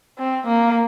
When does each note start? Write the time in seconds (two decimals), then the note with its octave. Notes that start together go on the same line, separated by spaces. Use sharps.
0.19 C4
0.47 A#3